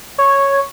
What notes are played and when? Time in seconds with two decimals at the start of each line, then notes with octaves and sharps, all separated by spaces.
0.18 C#5